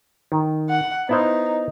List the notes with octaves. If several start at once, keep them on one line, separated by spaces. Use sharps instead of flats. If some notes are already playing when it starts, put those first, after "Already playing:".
D#3
F#5
B3 D#4 E4 C5